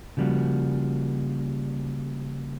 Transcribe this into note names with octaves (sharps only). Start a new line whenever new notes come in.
C#3 F3 G3 A#3 F#4